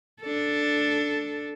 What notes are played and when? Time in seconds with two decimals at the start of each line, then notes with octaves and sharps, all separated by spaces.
0.22 D4 A4